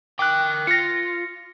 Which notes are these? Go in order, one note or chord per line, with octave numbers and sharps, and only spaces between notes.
A#4 G5 D6 F#6
F4 A#6 C#7